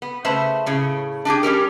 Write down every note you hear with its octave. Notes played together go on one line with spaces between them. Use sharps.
B3
C#3 A3 B4 C5 E5
A2 C#3
D4 G4 G#4 G5
G3 C#4 G4 A#4